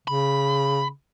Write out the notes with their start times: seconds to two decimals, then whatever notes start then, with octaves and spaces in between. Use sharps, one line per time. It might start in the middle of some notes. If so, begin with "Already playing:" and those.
0.08 C#3 B5